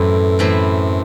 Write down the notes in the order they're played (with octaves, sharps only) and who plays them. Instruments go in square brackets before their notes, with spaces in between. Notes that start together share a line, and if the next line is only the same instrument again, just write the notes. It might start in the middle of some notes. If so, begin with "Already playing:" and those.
Already playing: [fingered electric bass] F#2 [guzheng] A2 E3 A3 C4 E4
[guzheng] A2 E3 A3 C4 E4